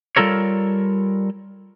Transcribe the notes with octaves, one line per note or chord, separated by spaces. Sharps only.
G3 F4 A4 A#4 C#5